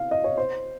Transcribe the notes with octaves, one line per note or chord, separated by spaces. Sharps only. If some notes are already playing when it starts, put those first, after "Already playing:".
Already playing: F5
D#5
C#5
C5